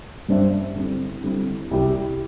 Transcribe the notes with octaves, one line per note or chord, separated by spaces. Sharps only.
G2 G3 D4 C5 E5
D3 G3 C4 E4
D3 G3 C4 E4
C2 C3 G3 E4 G4